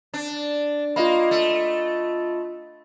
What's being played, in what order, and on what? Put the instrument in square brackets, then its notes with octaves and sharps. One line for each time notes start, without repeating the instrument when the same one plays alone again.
[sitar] D4
[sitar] A#3 [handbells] F4 D#5 B5
[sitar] A3